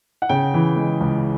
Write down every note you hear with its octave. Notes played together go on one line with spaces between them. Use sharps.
F#5
C#3 G5
E3
G#3
C#2